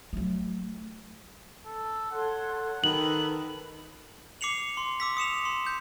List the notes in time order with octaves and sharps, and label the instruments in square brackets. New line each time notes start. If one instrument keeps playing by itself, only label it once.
[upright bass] F#3 A3
[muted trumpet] A4
[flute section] A4 C#5 C6 [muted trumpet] F#5
[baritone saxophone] D#3 [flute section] A4 B4 B5 [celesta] F#7
[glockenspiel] D6 C7 C#7 F7 F#7
C6
D6 E6 B6
D#6 C#7 E7 F7
C6
G6